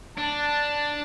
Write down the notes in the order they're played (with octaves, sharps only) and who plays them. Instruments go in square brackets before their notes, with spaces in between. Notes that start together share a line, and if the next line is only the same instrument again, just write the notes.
[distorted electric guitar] D4 [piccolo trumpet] A5